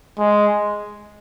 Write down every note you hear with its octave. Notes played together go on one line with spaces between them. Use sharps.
G#3